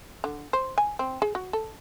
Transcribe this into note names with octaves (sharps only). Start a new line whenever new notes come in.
D3
C5
G#5
C4
G#4
F#4
A4